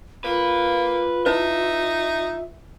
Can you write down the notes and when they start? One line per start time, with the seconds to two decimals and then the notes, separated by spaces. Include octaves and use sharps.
0.24 A#3 F4 B4
1.26 D#4 E4 B4 E5